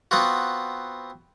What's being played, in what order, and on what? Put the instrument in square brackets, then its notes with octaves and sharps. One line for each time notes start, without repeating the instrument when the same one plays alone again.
[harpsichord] B3 C4 F4 F#4